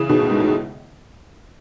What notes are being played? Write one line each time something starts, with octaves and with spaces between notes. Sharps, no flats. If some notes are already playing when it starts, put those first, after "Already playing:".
Already playing: C#3 E3
B2 D#3
A2
G#2
A2